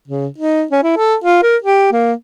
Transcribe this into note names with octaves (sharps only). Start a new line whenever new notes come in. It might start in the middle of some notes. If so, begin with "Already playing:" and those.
C#3
D#4
C#4
E4
A4
F4
A#4
G4
A#3